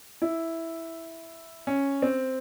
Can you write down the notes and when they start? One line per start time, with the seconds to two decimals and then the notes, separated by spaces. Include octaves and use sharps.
0.22 E4
1.67 C#4
2.02 C4